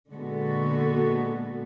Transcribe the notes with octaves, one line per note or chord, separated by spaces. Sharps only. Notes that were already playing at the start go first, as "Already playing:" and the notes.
A#2 D3 G#3 B3 F#4 A4